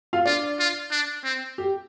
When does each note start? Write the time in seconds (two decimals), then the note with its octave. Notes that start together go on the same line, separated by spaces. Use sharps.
0.13 F4 F5
0.25 D4 F4 D5
0.59 F4
0.91 D4
1.24 C4
1.58 G4